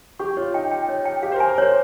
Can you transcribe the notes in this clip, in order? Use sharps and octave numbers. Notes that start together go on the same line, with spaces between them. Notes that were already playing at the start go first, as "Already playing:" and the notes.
G4 C#6
F4 C#5
D#4 G5
G5
C#5
G5
G4 F5
C5
A#4
G#5
A#4
C5 C#5